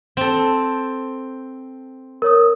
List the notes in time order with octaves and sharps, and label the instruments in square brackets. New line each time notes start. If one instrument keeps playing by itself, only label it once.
[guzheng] C4 A4
[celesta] A#4 C#5 D#6